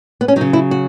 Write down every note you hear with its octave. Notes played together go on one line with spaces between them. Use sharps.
B3
C#4
F#3 D#4
C#3
E4
F#4